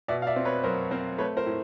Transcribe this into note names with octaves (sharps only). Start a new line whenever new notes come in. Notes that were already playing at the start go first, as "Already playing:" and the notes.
B2 D5 E5
F5
D5 E5
C4
B4 C#5
F#3 A#4 C5
C4 A#4 C5
A3 B4 C#5
A#4 C5
A2